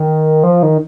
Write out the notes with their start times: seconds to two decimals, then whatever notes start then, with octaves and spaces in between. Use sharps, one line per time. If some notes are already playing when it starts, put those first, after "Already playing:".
Already playing: D#3
0.44 F3
0.63 D#3